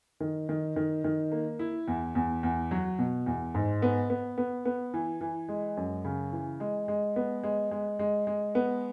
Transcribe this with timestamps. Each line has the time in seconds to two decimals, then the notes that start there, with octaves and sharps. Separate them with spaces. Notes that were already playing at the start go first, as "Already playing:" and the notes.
0.20 D#3
0.49 D#3
0.76 D#3
1.04 D#3
1.32 A#3
1.59 E4
1.88 E2
2.15 E2
2.43 E2
2.71 F#3
2.99 B2
3.26 E2
3.55 G#2
3.82 B3
4.10 B3
4.38 B3
4.65 B3
4.94 E3
5.21 E3
5.49 G#3
5.77 F#2
6.05 C#3
6.32 E3
6.60 G#3
6.88 G#3
7.16 B3
7.43 G#3
7.71 G#3
7.99 G#3
8.27 G#3
8.55 B3